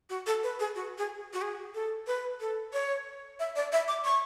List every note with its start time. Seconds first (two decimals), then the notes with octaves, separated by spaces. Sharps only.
0.10 F#4
0.27 A4
0.43 B4
0.59 G#4
0.75 F#4
0.98 G#4
1.33 F#4
1.42 G#4
1.74 A4
2.07 B4
2.41 A4
2.73 C#5
3.39 E5
3.56 D5
3.72 E5
3.88 D6
4.05 C#6